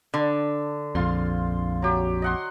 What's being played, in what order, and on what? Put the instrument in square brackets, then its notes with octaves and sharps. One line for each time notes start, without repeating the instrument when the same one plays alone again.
[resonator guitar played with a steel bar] D3
[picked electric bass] A#1 F2 [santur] F4 F5 C6
[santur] F#3 G4
D#5 F#5 C6